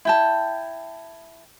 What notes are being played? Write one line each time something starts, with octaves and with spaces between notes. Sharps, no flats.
E4 G5 A5